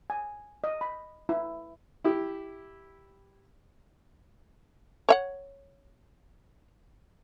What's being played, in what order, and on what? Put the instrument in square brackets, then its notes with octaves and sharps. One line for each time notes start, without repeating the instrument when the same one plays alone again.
[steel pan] G#5
D#5
B5
E4
[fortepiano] E4 G4
[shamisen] C#5 E5 F#5